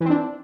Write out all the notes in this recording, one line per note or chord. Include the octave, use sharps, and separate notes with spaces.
E3 C4 D4